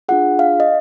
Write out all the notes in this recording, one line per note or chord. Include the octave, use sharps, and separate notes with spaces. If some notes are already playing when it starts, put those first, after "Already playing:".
D4 F4 G#4 F#5
F5
D#5